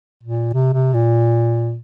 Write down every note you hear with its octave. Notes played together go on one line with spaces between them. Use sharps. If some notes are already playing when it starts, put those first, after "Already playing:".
A#2
C3
C3
A#2